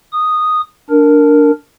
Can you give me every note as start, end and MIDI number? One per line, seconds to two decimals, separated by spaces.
0.13 0.61 87
0.90 1.51 62
0.90 1.51 70